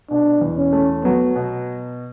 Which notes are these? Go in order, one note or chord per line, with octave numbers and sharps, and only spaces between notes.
B2 D4
E2
C#4
A3
F#3 B3
B2